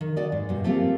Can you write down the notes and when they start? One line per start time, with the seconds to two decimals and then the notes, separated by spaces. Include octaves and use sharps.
0.01 D#3
0.16 F#4 D5 D#5
0.32 G#2
0.49 G2 B2
0.64 A3 A#3 C4 F4 G4 F5